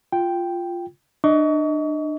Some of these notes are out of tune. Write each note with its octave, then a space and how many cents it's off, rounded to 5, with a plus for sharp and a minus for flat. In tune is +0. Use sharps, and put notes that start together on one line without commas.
F4 +0 G5 +0
D4 +35 D#5 +20 C#6 +35